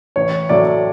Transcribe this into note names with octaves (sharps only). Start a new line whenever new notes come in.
A1 C#5
A2 F#3 A3 D5